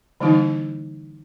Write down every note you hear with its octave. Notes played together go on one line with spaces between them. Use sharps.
D3 E3 G3 A#3 D#4 E4